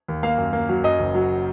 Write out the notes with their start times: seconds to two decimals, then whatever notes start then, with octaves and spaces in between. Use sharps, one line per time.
0.08 D#2
0.23 A#3 F5
0.38 F#2
0.53 A#3
0.69 F#3
0.84 F#2 D#5
0.99 F#1
1.15 F#3